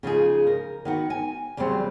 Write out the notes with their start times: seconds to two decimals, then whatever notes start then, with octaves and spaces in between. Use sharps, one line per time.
0.03 C#3 F3 D#4 G#4
0.47 A#4
0.85 D#3 B3 F#4
1.10 G#5
1.57 E2 C#3 F#3 G3 C4